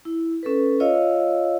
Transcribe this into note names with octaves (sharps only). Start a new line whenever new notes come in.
E4
C#4 A4 B4
F4 C#5 D#5 F5 E6